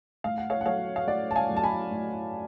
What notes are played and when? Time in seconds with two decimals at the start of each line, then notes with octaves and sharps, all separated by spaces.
0.24 A2 F5
0.38 F#5
0.50 C#5 F5
0.61 F#5
0.66 F#3 A3 C#5 F5
0.96 F5
1.07 A2 D5 F#5
1.31 A5
1.36 F5 G#5
1.49 F#3 A3
1.57 A5
1.63 G#5 B5
1.91 A2